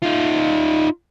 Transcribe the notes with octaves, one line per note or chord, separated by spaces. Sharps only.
D#4 F4